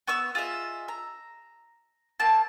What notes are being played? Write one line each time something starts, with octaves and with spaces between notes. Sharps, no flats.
B3 C#6 E6
F4 G#4 D#5 E5
A#5
A#3 C4 A5